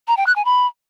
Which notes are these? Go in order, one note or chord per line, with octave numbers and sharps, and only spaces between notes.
A#5
G5
F#6
G#5
B5